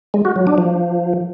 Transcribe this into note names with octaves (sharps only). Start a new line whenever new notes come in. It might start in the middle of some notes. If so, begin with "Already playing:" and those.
G#3
F#4
F#3
D4
F3